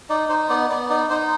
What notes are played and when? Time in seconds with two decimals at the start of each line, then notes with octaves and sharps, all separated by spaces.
0.09 D#4 D5
0.29 D#4 C5
0.49 B3 D5
0.70 B3 D5
0.90 D#4 D5
1.10 D#4 C5